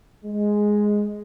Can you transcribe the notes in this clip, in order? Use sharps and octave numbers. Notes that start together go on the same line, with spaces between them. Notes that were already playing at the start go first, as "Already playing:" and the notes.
G#3